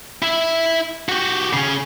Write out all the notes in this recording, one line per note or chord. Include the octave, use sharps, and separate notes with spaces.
E4 E5
F#4 G4
C#3 C#4